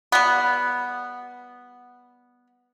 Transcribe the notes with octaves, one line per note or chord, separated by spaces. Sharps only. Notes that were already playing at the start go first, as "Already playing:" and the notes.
G3 B3